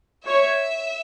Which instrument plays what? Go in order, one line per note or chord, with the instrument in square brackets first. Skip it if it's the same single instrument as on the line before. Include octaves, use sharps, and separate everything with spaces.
[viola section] C#5 [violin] E5